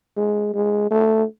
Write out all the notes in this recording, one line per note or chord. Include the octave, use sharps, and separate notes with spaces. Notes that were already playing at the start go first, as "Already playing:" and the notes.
G#3
G#3
A3